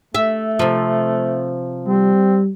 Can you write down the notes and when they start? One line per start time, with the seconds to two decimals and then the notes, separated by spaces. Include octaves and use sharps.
0.15 A3 E5
0.59 C3 F3
1.87 G3 C4